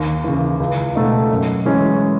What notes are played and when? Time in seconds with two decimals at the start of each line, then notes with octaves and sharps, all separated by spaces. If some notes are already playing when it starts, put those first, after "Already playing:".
Already playing: D#2
0.24 C#3 E3
0.60 C#2
0.95 B2 A3 D#4
1.31 F#2
1.65 E3 G#3 C#4